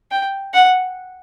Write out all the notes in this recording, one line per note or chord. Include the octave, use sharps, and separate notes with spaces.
G5
F#5